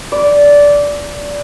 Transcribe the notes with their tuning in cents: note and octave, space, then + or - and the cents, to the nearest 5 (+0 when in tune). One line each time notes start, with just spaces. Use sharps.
D5 -15